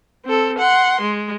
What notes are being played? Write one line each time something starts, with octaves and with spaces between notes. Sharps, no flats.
C4 A4
F#5 C6
G#3